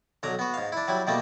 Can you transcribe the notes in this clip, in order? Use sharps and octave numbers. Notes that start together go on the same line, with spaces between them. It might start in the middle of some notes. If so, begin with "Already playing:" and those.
B1 D3 F#3 A#5
B3 F#4
G#2 F5
D4 E4
F#3 G3 E4
B2 G3 A3 A#3